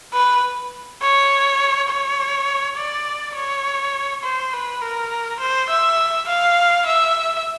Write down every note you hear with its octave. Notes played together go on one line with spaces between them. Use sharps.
B4
C#5
C#5
D5
C#5
C5
B4
A#4
C5
E5
F5
E5